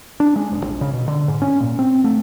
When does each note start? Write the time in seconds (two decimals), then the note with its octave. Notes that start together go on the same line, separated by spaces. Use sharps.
0.20 D4
0.36 G#3
0.52 D#1
0.64 A#1
0.81 C#3
0.93 B2
1.08 D3
1.28 G#2
1.42 C#4
1.60 A#2
1.79 C4
2.04 A3